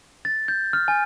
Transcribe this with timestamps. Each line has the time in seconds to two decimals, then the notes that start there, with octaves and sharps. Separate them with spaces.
0.25 A6
0.48 G6
0.73 F6
0.88 G#5